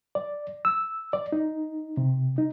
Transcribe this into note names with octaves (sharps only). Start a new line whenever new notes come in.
D5
E6
D5
D#4
C3
D#4